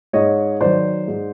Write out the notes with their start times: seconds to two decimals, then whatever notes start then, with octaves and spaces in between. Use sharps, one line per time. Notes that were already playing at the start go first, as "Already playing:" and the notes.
0.13 G#2 C#5 D#5
0.60 D#3 F#3 C5 D5
1.08 G#2